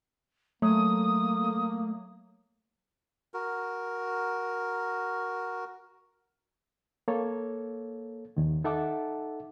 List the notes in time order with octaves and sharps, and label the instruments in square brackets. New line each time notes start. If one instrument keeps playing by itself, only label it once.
[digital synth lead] F#3 [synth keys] A3 [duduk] A#3 [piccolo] D#6
[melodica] F#4 A#4
[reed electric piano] A#3 A4 C#5
D#2 D#3
D#4 A4 E5 F#5 A5 D6